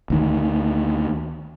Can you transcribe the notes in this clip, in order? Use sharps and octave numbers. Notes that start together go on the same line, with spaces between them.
D2 D#3